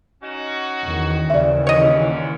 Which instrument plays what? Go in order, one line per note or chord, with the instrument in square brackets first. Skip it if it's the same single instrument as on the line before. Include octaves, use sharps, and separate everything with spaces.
[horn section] C#4 D#4 F#4
[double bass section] E2 D#3
[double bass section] D#2 C#3 E3 [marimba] D5 E5
[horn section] A#2 D3 C#4 [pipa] C#5 D#5